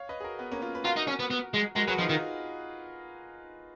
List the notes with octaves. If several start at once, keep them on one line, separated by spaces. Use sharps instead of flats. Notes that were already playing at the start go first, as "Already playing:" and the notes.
Already playing: C#5 F5
B4 D#5
G#4
F#4 A#4
B3
A#3 C#4
C#4 F4
B4
F4 F#4 A#4
D#4
C#4
B3
B3
G#3
G#3 F#4 A#4
F#3 G#4 B4
F3 D#4 F#4
D#3 F4